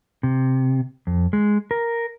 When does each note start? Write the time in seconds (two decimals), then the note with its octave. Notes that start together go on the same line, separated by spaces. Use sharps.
0.23 C3
1.07 F2
1.33 G#3
1.71 A#4